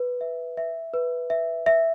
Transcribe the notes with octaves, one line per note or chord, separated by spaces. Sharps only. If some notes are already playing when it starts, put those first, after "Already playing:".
Already playing: B4
E5
E5
B4
E5
E5